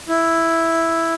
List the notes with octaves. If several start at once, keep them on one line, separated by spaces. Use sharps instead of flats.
E4